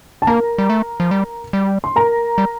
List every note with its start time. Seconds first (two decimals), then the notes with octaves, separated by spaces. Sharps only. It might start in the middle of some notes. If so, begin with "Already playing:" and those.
0.22 A5
0.27 A#3 A#4 A#5
0.58 G3
0.70 A3
1.00 F3
1.11 G3
1.53 G3
1.84 C6
1.96 A#4 A#5
2.38 G3